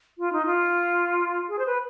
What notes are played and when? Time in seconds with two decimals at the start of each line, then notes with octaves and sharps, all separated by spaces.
0.18 F4
0.32 D#4
0.46 F4
1.49 G#4
1.58 C5
1.66 B4